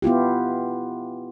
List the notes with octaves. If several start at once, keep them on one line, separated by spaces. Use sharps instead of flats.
B3 E4 F4 G4